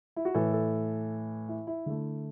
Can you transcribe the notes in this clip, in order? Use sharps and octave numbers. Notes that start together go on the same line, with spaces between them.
E4
F#4
A2 E3 A3 A4
A4
E4
E4
D3 A3